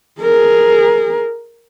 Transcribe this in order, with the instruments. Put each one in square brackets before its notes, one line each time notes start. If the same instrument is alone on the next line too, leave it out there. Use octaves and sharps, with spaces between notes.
[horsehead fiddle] G#4 A#4